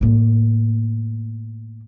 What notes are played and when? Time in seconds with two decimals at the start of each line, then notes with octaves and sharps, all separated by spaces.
0.01 A2 A#3